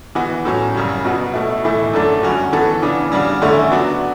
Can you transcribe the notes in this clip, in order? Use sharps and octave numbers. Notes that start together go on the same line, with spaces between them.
E3 B3 F#4
A2 F#3 C#4
F#2 C#3 G3
B2 F#3 B3 F#4
B2 A3 E4
A2 E3 A3 E4
F#2 D3 A3 D4 A4
G2 F#3 C#4 F#4
E3 B3 F#4 A4
C#3 E3 B3 D4
C#3 G3 D4 F#4
E2 D3 A3 C#4 E4
F#3 B3 D4 F#4